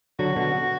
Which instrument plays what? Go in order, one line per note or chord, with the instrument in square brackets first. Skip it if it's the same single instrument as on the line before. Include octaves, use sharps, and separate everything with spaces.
[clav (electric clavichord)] D3 F#3 [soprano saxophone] F#4
[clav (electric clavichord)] B2 D3